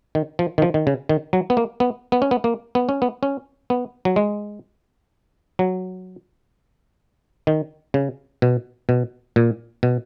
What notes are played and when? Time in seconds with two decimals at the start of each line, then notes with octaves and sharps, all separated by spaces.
0.15 D#3
0.39 F3
0.58 D#3
0.62 F3
0.74 D#3
0.87 C#3
1.09 D#3
1.33 F#3
1.50 B3
1.57 A#3
1.80 B3
2.12 B3
2.22 C#4
2.31 B3
2.44 A#3
2.75 B3
2.89 C#4
3.02 B3
3.23 C#4
3.70 B3
4.05 F#3
4.16 G#3
5.59 F#3
7.47 D#3
7.94 C#3
8.42 B2
8.89 B2
9.36 A#2
9.83 B2